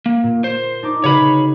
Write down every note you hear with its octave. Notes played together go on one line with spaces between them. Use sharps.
A#3
A#2
C5
D4 D#4 D6
C#3 F#4 B4 C#5 B5